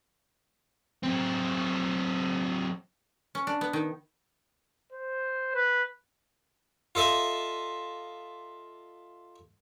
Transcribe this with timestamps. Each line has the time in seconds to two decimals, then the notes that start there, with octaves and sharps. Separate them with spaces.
1.03 F#3 C4
3.35 C#4
3.47 D4
3.61 B3
3.73 D#3
4.92 C5
5.55 B4
6.95 F4 A4 D#5 E5